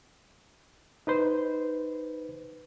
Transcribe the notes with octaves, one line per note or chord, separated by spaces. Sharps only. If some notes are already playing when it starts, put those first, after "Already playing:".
D#4 B4 C5